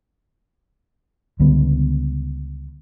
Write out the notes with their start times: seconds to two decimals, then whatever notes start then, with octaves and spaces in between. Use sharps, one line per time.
1.40 C#2 D3 G3 B3